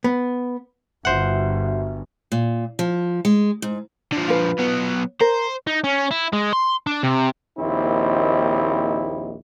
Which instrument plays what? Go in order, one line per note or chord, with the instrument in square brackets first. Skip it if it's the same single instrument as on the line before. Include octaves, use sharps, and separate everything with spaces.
[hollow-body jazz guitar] B3
[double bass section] G1 [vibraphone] F#4 E5 [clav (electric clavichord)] C5 F#5
[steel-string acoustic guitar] A#2
F3
G#3
G#2
[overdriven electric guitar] D3 F3
[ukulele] F4 B4
[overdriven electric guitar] F#3 B3
[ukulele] A#4 [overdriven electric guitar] C5
[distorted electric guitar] D#4
C#4
E4
G#3
C6
D4
C3
[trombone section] A#1 D#2 C4 D#4 E4